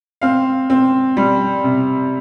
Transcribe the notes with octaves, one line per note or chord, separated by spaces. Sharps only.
C4 F5
C4
G3
C3